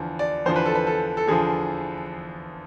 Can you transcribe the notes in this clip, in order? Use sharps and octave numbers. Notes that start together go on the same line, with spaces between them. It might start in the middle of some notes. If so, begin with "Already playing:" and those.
Already playing: E2 D3 F3
D5
E2 D3 F3 C5
B4
A4
B4
A4
A4
E2 D3 F3 G#4